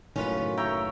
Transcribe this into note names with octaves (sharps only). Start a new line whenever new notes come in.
F#1 F#2 A2 D#3 C#4 F4 B4
C#5 E5 G5 A#5